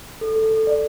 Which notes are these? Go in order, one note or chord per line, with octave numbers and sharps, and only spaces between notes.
A4
A4
A4
D5